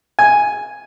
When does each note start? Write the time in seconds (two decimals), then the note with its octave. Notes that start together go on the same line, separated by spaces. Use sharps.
0.19 G#5